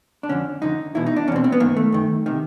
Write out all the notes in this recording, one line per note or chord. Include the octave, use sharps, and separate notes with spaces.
D4
F2 D3 C#4
F2 D3 D#4
E2 B2 E4
D#4
D4
E2 B2 C4 C#4
C4
B3
F#2 D#3 A#3
A3
F#2 D#3
C3 D#3